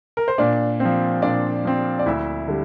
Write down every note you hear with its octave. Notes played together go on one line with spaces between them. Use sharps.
A#4
C5
A#2 D4 D5
C4
F3
A#2 D4 D5
F3 C4
D5
D2 E4 E5
D3 G3